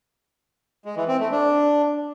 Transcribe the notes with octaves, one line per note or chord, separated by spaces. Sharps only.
G#3
E3
C4
A3
D4